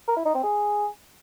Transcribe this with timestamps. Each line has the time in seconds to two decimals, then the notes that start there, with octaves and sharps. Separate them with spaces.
0.08 A#4
0.17 E4
0.25 D#4
0.34 C4
0.43 G#4